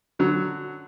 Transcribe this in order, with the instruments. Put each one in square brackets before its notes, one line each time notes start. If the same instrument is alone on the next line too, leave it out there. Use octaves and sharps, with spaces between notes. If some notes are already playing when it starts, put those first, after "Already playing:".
[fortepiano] D3 F#3